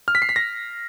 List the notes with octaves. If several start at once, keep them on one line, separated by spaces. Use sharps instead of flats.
F6
B6
C7
B6
A#6